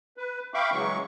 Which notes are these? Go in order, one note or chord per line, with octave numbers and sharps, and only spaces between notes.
B4
E5 F5 G5 B5 C#6 D6
C#3 E3 F#3 G#3 C#6